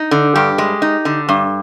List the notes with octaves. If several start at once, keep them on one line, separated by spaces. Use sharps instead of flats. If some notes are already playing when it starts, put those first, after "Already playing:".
Already playing: D#4
D3
G2 G4
G#3
D#4
D3
G2